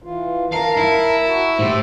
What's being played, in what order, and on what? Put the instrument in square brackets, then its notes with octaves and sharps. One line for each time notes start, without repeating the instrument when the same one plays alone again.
[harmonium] E3 F4
[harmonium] A#4 A5 A#5 [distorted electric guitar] F5
[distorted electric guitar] E4
[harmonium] F#4
[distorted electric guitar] A2 [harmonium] G4 C5 E5